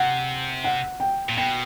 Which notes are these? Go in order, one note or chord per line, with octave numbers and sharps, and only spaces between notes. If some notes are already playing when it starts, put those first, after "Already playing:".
Already playing: C3 F#5
F#5
G5
A#2
B2 G5